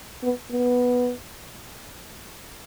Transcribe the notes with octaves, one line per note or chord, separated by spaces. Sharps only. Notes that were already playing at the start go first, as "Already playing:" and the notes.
B3
B3